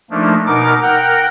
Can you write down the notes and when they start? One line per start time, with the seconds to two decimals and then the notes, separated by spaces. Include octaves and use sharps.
0.11 F3 A3 A#3 D4 D#4
0.47 B2 D#4 A#4 D6
0.82 A#4 F#5 G5 A#5